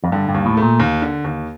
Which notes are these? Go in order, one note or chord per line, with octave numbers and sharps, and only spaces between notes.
F2
G2 D3
G2
D#2
A2
A3
A#2
D#2
D3
D#2